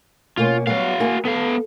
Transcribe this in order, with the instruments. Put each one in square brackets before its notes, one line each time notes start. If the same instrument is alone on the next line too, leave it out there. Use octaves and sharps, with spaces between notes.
[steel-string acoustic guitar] B2 A#3 C#4 [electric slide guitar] F4
[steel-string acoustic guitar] F#3 G3 B3 [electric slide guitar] F#4 F5
[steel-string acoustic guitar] A#3 E4 G#4
[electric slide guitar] B3 F5 [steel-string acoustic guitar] A4